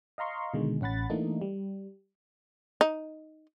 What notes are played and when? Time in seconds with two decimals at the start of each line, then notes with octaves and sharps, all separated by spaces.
0.18 D#5 F5 A#5 C6 C#6
0.54 B2 D3 D#3 G#3
0.81 A1 C#4 F#5 B5 A6
1.10 E3 A3 A#3 D4 D#4
1.41 G3
2.81 D#4